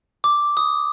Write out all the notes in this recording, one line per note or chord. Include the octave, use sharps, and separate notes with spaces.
D6
D#6